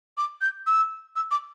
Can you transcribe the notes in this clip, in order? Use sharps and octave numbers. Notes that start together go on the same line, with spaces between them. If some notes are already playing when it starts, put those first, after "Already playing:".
D6
G6
E6
E6
D6